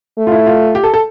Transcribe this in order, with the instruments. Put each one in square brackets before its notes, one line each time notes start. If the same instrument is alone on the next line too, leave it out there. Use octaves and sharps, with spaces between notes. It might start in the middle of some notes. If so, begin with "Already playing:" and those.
[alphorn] A3
[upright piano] F4
E4
F4
G4
A4
A4